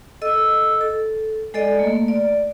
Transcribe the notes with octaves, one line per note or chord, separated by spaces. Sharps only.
A4 D#5 E6
A4
G#3 A4 D5 D#5
A3 A#3
D5